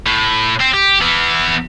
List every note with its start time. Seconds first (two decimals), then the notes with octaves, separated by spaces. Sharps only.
0.06 A2
0.61 C4
0.74 G4
1.01 E3 B3